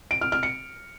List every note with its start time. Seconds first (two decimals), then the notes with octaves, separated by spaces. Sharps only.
0.11 D7
0.21 F6
0.32 F6
0.43 C#7